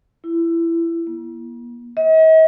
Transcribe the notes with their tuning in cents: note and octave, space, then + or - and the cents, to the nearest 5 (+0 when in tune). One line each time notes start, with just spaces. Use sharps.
E4 +20
A#3 +45
D#5 +45